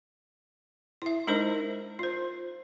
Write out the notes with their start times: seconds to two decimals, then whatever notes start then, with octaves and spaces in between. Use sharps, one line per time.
1.02 E4 E5
1.27 G#3 D4 D#4 A#4 C5 D#5
1.99 F4 C5